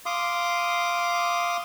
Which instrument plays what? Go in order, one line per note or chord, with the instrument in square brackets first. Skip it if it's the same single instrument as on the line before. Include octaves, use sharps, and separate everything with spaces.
[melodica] F5 C6 D6 D#6